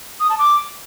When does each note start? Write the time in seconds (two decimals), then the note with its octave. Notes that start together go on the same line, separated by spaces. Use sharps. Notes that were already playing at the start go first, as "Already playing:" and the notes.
0.20 D#6
0.30 A5
0.39 D6